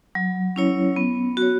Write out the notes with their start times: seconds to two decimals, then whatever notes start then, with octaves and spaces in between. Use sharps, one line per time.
0.15 F#3
0.56 C#4 E4 C#5
0.96 B3
1.37 F#4
1.42 C#5